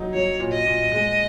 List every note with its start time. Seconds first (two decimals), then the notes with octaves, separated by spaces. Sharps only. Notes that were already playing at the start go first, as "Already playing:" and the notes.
Already playing: F#3 D#4
0.14 F#3 C#5
0.39 A#2
0.52 D#5
0.66 A#2
0.92 G#3